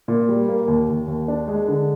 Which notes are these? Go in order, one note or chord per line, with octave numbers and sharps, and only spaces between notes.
A#2
G3
A#3
D#2
D#2
D#2
D4
G#3
D3